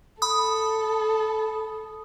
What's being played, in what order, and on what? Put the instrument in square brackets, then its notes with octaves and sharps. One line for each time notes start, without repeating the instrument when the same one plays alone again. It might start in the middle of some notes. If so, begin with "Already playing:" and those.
[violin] A4 [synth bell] B5 D#6